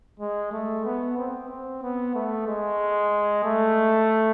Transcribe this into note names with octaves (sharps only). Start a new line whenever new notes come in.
G#3
A3
B3
C4
C4
B3
A3
G#3
A3